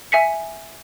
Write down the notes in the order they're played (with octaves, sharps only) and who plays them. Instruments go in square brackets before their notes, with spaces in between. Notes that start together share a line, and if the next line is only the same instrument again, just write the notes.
[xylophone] E5 G#5 B6 C#7